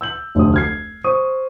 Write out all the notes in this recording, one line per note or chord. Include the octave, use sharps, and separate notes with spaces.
E6 G6 F#7
F1 D2 F#3 D#6
F6 G#6 C7
C5 C#6 D#6 D#7